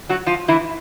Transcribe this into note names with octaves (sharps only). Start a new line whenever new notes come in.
F#3 F#4
F3 F4
E3 E4